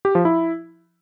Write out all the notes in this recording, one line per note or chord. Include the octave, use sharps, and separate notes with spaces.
G4
F3
E4